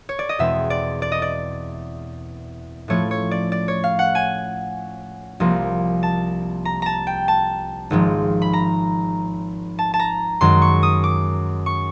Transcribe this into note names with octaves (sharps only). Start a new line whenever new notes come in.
C#5
D5
D#5
E2 B2 G#3 C4 E5
D5
D5
D#5
D5
A2 F3 A3 C#4 E4 C#5
C#5
D5
D5
C#5
F5
F#5
G#5
C2 C3 F3 A#3
A5
A#5
A5 A#5
G5
A5
G#1 G#2 F3 G#3
B5
A#5
A5
A5
A#5
F#2 D#3 G#3 C6
C#6
D#6
D6
C#6